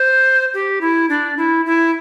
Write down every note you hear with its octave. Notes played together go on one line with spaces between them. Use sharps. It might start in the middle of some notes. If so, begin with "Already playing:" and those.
Already playing: C5
G4
E4
D4
E4
E4